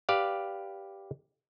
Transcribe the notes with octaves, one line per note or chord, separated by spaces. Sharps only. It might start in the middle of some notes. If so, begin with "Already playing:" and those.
G4 B4 D5 F5